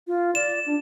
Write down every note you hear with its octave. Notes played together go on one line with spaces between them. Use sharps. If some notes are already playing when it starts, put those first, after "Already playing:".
F4
D5 E7
D4